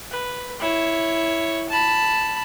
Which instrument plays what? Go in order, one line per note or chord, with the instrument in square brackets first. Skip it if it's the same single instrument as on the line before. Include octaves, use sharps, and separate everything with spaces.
[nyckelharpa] B4
E4 C#5
A5 B5